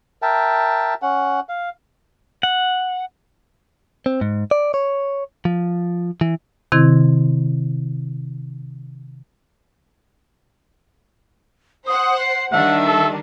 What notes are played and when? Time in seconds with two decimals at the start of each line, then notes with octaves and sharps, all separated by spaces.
0.22 A#4 E5 G5 A5
1.02 C#4 F#5
1.49 F5
2.43 F#5
4.06 C4
4.21 G#2
4.51 D5
4.74 C#5
5.45 F3
6.21 E3
6.72 C3 D#3 C4 E4 E6 G#6
11.87 C5 F#5 D#6
12.20 C7
12.52 D#3 G3 D4 E5 F#5
12.86 A4